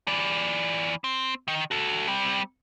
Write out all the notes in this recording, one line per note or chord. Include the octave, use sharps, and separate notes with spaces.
E3 D5
C4
D#3
F#4 A4
G3 C4